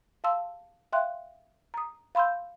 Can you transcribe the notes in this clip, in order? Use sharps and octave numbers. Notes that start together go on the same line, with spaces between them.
F5 A5 C6 E6
E5 F5 G5 C6 F#6
A#5 D#6
F5 B5 C6 E6 G6